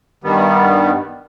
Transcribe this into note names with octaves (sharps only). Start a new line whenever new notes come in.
G2 D#3 G3 B3